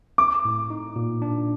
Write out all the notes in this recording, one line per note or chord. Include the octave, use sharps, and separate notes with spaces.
C4 D6
A2
D#4
A#2
D4